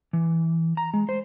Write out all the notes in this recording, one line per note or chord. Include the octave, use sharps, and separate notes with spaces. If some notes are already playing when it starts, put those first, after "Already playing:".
E3
A#5
G#3
C5